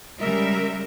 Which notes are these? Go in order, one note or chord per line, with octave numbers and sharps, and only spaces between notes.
C#3 G3 G#3 A#4 E5